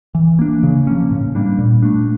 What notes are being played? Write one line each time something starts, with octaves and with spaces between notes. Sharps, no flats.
E3
A#3 D4
C#3
F3 A#3 C#4
A2
G3 A#3 D4
A#2
A3 D4